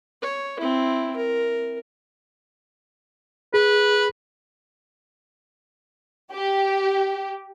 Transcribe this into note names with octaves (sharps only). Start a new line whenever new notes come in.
C#5
C4 E4
A#4
G#4 B4
G4